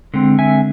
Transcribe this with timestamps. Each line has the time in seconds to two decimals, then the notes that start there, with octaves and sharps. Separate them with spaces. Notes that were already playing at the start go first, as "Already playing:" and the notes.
0.14 D3 G#3 C4
0.39 E5 G#5